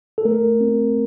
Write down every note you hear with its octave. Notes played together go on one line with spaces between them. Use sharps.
A4
A3 A#4
C4